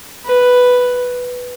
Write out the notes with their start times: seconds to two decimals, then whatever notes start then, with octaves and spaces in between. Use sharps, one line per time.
0.25 B4